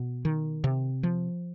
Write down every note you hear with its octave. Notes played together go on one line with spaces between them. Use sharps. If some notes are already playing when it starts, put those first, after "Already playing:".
Already playing: B2
D#3
C3
F3